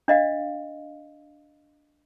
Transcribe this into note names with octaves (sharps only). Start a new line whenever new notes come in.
D4 D#5 F5